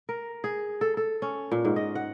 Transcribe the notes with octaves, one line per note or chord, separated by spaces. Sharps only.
A#4
G#4
A4
A4
C#4
A#2
G#2
D#5
F#5